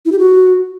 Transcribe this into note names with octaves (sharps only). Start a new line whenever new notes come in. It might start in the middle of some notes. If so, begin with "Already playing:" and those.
E4
G4
F#4